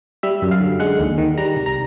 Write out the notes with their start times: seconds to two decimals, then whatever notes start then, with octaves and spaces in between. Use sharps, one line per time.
0.23 G3 E5
0.42 F#2
0.51 F5
0.60 D3
0.80 G#3 F#5
1.00 D#2
1.18 D#3
1.38 G3 A#5
1.56 C2
1.66 A#5